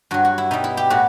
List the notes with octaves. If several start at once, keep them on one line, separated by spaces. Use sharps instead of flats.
G2 F#3 F#4
F#4
E4
B2 G3 D#4
E4
G4
A2 F#4